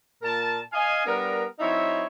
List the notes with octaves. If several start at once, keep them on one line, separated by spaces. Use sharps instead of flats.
A#2 A#4 A5
D#5 F5 G#5
G3 B3 D4 A#4
F#3 C4 D#4 E4 C#5 E5